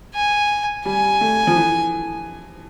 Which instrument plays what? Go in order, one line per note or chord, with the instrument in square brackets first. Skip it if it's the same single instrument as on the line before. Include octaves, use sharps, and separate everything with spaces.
[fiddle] G#5
[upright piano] G3 [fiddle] G#5
[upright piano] A3
F3
E3